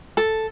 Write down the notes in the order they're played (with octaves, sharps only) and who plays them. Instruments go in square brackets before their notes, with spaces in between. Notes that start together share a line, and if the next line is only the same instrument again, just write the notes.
[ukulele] A4